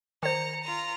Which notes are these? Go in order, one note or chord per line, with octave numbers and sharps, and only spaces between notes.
D#3 C5 A#5 C#7
F4 A#5